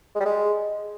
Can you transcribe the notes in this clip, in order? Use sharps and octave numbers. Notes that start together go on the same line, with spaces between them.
G#3
G3
G#3